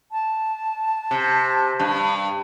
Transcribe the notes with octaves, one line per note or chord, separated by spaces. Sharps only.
A5
C3
G2